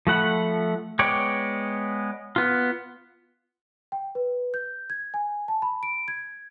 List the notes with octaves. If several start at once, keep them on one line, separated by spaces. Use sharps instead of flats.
F3 A3 F#5 B5
G#3 B3 C#5 D5 G5
B3 F4
G5
B4
G6
G#6
G#5
A5
B5
D7
G#6